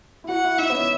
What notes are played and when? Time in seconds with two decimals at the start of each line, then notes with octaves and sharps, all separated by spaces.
0.24 E4
0.29 F#4 F#5
0.44 E4
0.58 D#4 E5
0.70 B3
0.74 C#4